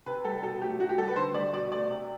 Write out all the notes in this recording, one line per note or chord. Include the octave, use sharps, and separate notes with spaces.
C3 B4
G3 A4
B2 A4
F#3 A3 G4
A2 F#4
G4
G3 A4
B4
D3 C5
G3 D5
B2 D5
A3 D5
C3